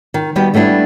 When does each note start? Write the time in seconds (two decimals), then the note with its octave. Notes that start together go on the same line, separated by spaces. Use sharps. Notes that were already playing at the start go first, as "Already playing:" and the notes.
0.14 D#3
0.36 D#3 G3 B3 F#4 G5
0.54 G3 A3 B3 D4 E4